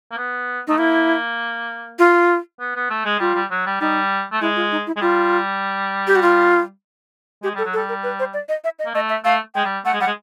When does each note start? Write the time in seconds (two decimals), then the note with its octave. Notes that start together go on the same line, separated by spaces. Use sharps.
0.11 A#3
0.18 B3
0.67 A3 D#4
0.78 A#3 E4
1.99 F4
2.60 B3
2.75 B3
2.90 A3
3.05 G#3
3.20 G3 F4
3.35 G3
3.51 F#3
3.66 G3
3.81 G3 D#4
4.32 A3
4.41 G#3 E4
4.56 F4
4.72 D#4
4.87 E4
4.97 G#3
5.01 G3 F4
6.07 G4
6.16 F#4
6.22 F4
7.43 G#3 G4
7.55 G3 A4
7.65 F#3
7.73 A4
7.77 G3
7.89 A#4
8.03 B4
8.19 C5
8.34 D5
8.49 D#5
8.64 E5
8.79 D#5
8.86 A#3
8.94 A3 D#5
9.09 E5
9.25 A3 F5
9.55 G#3 G5
9.65 G3
9.85 A3 F#5
9.93 G#3
10.00 G3 F#5
10.07 G#3